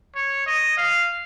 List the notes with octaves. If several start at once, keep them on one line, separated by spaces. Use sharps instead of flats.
C#5
D#5
F5